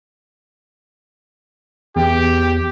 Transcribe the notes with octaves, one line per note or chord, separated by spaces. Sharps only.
E2 G4